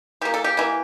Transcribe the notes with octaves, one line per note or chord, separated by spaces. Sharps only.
E3 A#3 G4
A4
G4
E3 A#3